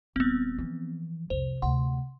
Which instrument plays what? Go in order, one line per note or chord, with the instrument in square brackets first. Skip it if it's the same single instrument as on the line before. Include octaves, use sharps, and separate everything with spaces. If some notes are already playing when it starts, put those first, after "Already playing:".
[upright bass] D#1 [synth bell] B3 C4
[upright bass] E3 F3
[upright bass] C2 F2 [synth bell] C5
[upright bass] D2 C3 [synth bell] F#5 C6